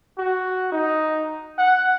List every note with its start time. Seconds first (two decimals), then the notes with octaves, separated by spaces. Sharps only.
0.18 F#4
0.72 D#4
1.58 F#5